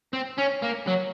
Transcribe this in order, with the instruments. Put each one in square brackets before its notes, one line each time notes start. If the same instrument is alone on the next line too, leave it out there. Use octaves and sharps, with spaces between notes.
[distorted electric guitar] C4
C#4
A#3
F#3